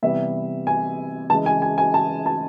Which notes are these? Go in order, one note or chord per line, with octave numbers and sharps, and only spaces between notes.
C3 E3 G3 B3 E5
G#5
C#3 E3 G#3 A5
G#5
G#5
G#5
A5
A5